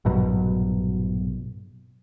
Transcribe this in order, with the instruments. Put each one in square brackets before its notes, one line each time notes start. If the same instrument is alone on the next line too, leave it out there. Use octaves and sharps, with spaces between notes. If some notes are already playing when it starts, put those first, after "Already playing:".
[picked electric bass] A#1 G2 B2 F#3